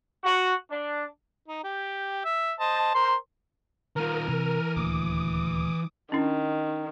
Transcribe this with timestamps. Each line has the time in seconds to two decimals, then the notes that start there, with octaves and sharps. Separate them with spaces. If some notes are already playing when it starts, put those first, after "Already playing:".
0.24 F#4
0.70 D4
1.48 D#4
1.64 G4
2.25 E5
2.60 C5 D#5 A5
2.94 A#4 C5 C6
3.96 D#3 F4 A#4 F6 D#7
4.28 C3 E3
4.76 D#1 D2 A#3 D6 D#6
6.12 D#3 C#4 D4 E4